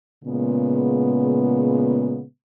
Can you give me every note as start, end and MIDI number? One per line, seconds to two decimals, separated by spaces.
0.24 2.23 46
0.24 2.23 49
0.24 2.23 56
0.24 2.23 59